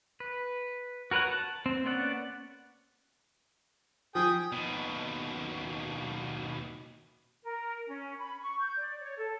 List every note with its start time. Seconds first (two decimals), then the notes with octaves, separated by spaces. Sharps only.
0.20 B4
1.11 F#4 A#4 B4 C#5 F#5
1.27 A5
1.66 C4
1.85 A#3 B3 C#4 D5 F#5
4.15 F3 G#4 G5 D#6
4.52 D#2 B2
7.43 A#4
7.86 C#4
8.18 B5
8.39 C#6
8.60 G6
8.77 D5
8.99 C#5
9.17 A4